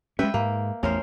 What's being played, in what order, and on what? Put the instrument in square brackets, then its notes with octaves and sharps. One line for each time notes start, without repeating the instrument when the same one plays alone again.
[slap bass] G#3 C#4 [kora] B4 E5 G5
[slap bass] G#2 [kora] A#3
[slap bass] A1 E2 A3 [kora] C#4 A#4 C5